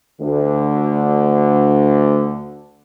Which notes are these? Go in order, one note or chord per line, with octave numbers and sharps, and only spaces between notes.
D2 D3